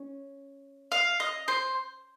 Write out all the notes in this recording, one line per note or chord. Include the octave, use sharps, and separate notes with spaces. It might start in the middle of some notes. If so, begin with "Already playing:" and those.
Already playing: C#4
F5
D#5
C5